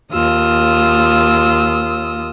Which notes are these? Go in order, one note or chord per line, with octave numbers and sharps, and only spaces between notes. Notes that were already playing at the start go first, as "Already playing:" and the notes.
D#2 F4 D#6 E6